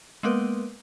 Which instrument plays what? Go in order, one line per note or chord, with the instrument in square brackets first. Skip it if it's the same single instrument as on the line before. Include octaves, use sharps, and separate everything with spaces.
[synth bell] G#3 A#3 B3 A#4 B4